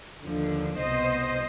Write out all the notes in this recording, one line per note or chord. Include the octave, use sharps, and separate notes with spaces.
D#2 D3 F3
C2 B2 C5 D#5